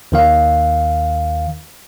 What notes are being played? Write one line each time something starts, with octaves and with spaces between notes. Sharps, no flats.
D#2 D#3 F5